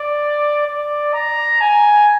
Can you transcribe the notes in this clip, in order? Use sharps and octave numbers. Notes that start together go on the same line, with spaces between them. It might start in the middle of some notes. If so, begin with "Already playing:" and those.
Already playing: D5
D5
A#5
G#5